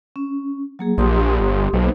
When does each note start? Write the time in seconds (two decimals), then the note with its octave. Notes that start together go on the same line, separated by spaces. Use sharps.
0.16 C#4
0.79 F#3 A#3 G#4
0.98 A#1 G4 C6 D#6
1.40 G1
1.73 B1 A#3 D#4 C5